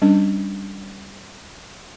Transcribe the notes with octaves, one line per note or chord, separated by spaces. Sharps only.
G3 C#4 D4